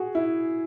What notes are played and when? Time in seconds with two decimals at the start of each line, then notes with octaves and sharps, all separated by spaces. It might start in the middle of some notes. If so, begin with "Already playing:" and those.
Already playing: F#4 G#4
0.15 E4